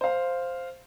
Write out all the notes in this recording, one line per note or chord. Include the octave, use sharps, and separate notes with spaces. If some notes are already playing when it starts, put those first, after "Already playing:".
C5 F5